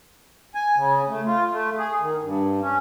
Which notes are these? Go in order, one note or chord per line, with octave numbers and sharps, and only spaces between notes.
G#5
C#3
A3
F4
A3
G#4
D#3
G2
C#4